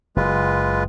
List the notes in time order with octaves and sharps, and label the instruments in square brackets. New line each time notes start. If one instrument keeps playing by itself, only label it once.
[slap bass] F#1 [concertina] G#3 F4 B4